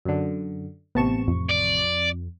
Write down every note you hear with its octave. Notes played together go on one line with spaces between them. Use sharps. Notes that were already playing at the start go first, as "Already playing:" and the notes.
F#2 D3
A1 C3 B3 A5 C#6 E7
F2
D5